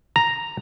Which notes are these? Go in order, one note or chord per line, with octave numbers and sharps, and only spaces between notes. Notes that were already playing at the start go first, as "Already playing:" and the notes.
A#5